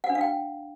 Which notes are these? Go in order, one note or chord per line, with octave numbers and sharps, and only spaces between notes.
F#5
D4
F5
G5